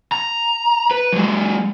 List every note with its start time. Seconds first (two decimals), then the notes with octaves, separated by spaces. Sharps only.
0.12 A#5
0.91 B4
1.12 F#3 G#3